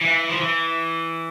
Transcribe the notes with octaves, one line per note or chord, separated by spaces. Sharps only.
E3
F3
E3